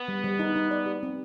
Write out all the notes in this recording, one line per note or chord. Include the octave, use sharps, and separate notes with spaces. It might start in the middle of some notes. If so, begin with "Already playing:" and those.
Already playing: B3
G3
G3
D#4
D#4
D5
G4
C4